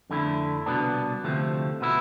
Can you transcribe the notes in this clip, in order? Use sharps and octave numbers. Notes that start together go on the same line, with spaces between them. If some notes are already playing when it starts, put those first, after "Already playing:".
F2 D3 A3 E4
C2 B2 B3 D4
D2 C3 F3 A3
B2 B3 E4